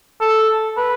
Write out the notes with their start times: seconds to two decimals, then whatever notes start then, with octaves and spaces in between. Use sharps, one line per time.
0.21 A4
0.77 B4